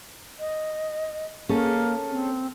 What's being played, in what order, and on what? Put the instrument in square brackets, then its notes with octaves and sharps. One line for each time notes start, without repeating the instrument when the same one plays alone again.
[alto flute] D#5
[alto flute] A#3 [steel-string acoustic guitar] C#4 G#4 A4
[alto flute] C4